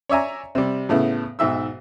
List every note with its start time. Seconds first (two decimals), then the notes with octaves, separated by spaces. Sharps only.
0.09 C#5 D5 E5 G#5 A#5
0.55 C3 G3
0.89 A2 C#3 B3 E4
1.39 B1 G#2 E5 E6